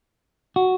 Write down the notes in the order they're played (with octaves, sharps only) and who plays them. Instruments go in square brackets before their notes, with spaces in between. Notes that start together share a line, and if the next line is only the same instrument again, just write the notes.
[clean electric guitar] F#4